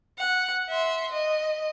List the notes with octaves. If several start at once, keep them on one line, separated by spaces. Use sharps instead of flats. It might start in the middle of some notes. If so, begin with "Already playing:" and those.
F#5
E5 C6
D#5